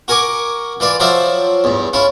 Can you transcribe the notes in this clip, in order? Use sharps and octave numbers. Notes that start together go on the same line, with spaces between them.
F#4 A#4 G#5 C#6 D6
E3 F4 D5 B5
F3 F#3 C5 D5 E5 F5
E2 G2
C#4 E4 F4